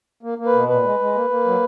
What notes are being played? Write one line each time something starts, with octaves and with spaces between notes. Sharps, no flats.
A#3
A#3
B4
B2
A#2 B4
G#3
G#3
A#3
A#3
F#3